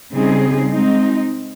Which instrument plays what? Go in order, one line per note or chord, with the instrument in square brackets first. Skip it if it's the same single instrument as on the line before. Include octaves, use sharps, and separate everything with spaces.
[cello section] C#3 G3 C4 D#4 G#4
G#3 C4 D#4